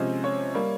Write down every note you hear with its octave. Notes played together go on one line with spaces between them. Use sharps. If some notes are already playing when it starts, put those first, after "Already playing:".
Already playing: C3 F3 G#3 C#4 C5
C#5
G3 A#3